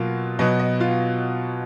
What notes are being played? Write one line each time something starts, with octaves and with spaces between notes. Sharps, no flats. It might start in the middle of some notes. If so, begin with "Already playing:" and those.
Already playing: B2 F#3 A#3 F4
B2 F#3 B3 D#5
D#5
F4 F5